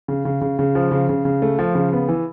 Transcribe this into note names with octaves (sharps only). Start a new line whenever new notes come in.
C#3
C#3
C#3
C#3
F3
C#3
C#3
C#3
A3
F3
C#3
B3
E3